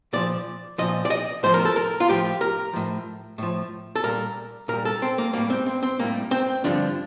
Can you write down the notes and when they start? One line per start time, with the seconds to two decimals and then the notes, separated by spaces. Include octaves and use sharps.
0.13 A#2 F3 D5
0.78 A#2 F3 D#5
1.05 D5
1.10 D#5
1.43 A2 F3 C5
1.54 A#4
1.65 A4
1.76 A#4
2.00 F4
2.09 A2 F3 G4
2.41 A#4
2.73 A2 F3
3.38 A2 F3
3.95 A4
4.03 A#2 G3 A#4
4.68 A#2 G3 A#4
4.85 A4
5.02 C4
5.18 A#3
5.34 A2 G3 A#3
5.50 C4
5.66 C4
5.83 C4
5.99 A2 G3 A#3
6.31 C4
6.64 G2 D3 F3 D4